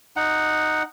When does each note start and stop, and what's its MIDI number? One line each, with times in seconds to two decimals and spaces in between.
0.16 0.83 63
0.16 0.83 78